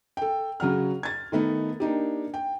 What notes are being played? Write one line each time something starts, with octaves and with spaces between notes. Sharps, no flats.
A4 G5
C#3 F#3 F#5 F6
G#6 A6
D#3 A3 B3 D#4
A#3 D4 D#4 G4
G5